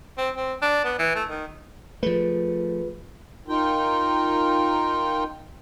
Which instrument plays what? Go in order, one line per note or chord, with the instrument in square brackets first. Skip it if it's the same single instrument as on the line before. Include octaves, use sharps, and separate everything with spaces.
[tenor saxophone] C4
C4
D4
B3
E3
A3
D#3
[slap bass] F3 A3 [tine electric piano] F4 G#4 B4
[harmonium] D#4 F4 A#4 G5